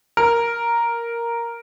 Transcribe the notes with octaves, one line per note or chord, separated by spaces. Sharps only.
A#4